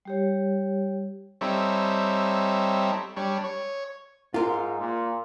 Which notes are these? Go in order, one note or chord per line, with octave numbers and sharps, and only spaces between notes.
G3 G4 C#5
G3 C4 D#4 A4 C#5 E5
G3 D4 C#5
C#5
G#2 F4 A#4
A#2